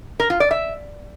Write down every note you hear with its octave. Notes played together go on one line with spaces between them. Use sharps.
A#4
F4
D5
E5